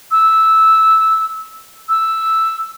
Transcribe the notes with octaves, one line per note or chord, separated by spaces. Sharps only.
E6
E6